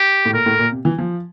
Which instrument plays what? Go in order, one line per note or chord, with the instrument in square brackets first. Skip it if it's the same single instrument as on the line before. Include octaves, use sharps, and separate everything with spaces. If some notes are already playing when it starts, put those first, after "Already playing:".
Already playing: [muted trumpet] G4
[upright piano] A2
[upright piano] A#2 [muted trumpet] A#4
[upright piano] A2
A#2
C3
E3
F3